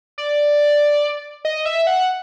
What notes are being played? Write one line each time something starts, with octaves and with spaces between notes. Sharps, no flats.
D5
D#5
E5
F#5